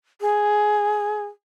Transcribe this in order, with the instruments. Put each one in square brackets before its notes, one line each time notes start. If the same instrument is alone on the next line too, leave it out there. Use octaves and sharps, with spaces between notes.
[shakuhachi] G#4